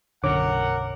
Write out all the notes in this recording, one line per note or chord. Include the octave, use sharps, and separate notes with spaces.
B1 F#2 D3 A#4 C#5 F#5 D6